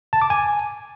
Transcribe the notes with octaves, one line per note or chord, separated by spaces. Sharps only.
A5
D6
G#5